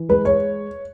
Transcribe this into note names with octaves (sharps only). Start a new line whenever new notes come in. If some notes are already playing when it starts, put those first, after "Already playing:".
Already playing: E3
G#3 B4
C#5